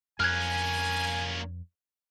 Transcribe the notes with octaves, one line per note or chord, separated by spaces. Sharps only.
F2 A#3 C#4 G#5 F6 F#6 G#6